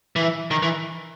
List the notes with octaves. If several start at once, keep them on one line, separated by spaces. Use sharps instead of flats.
E3
D#3
E3